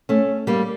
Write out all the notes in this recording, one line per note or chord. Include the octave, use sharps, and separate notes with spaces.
A3 C#4
G3 A#3